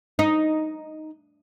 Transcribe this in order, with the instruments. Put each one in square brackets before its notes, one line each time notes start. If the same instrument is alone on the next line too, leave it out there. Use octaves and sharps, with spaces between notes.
[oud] D#4